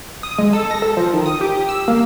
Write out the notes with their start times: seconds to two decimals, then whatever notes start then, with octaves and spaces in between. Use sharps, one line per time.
0.23 D#6
0.38 G#3
0.53 A4
0.71 A#6
0.82 A4
0.97 F3
1.13 D#3
1.26 D#6
1.41 G4
1.69 E6
1.88 A#3